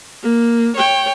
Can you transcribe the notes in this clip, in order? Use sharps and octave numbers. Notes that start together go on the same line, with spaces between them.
A#3
C#5 G5